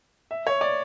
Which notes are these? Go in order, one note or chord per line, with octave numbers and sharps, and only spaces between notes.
E5
C#5
D5